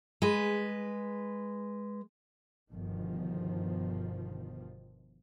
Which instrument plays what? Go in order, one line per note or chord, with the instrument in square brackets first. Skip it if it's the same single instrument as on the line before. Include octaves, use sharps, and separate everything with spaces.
[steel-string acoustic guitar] G#3 B4
[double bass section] G1 B2 D#3 F3